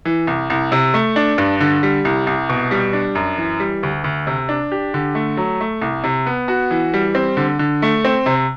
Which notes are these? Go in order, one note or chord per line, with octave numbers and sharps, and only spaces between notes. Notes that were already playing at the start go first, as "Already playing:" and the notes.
E3
C2
C2
C3
A3
D4
G2
D3
G3
C2
C2
B2
G3
D4
F#2
E3
G3
D2
D2
C3
D4
G4
D3
A3
F#3
A3
C2
C3
B3
F#4
E3
G3
C4
D3
D3
A3
C4
C3